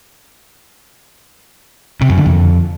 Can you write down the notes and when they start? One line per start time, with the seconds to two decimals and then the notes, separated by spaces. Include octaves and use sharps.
2.01 C3
2.09 F#2
2.18 D3
2.26 F2